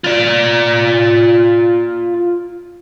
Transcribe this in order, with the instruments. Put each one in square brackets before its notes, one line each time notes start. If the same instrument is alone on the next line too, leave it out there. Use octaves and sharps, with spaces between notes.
[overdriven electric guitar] F4 D5